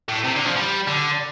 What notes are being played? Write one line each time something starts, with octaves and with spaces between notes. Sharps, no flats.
A2
C3
D3
F3
G3
D3